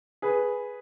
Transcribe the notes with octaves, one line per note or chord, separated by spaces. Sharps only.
G#4 B4